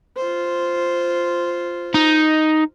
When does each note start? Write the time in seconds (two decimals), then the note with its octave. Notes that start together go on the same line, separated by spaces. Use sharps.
0.16 F4 C5
1.94 D#4